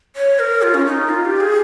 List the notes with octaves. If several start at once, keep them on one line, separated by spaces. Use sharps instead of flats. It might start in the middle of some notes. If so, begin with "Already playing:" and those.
C#5
A#4
F4
C#4
D#4
F4
G4
G#4